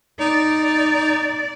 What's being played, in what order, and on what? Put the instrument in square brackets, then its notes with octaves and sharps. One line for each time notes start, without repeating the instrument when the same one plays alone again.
[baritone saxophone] D#4 [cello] D5